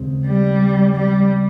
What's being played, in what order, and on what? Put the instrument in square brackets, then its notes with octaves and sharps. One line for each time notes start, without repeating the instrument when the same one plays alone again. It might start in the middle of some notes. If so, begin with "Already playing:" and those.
Already playing: [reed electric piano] D#2 C#3 G#3 C4
[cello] G3
G3